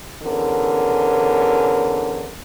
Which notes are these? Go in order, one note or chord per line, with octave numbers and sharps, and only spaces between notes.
E2 D3 C#4 A#4